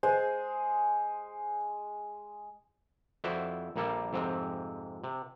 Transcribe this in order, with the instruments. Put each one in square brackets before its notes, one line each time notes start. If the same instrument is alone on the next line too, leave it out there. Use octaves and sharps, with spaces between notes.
[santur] G#3 G#4 [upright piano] C5
[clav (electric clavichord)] F2 E4 F#4 C5 D5 E5
A#1 A#2 G3 A#3 A4
F2 G#2 C3 C4
C3